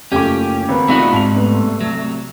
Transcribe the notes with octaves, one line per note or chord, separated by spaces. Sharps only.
F#1 A3 C#4 F4 G4 D6
G#1 A#3 B4 B5
C2 A3 B3 D#4 F4 F#4
G#2 A5 F7
A3 B3 B4
C3 F#3